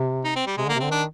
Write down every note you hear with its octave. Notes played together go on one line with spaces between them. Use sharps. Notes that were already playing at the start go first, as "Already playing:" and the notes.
Already playing: C3
D#4
C4
G3
C3 G#3
D3
A#3
C3
C4
D3
D#3 D4